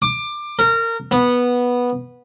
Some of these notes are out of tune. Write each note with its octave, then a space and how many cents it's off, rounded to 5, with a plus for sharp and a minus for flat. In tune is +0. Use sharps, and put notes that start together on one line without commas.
D6 +20
A#4 -25
B3 -10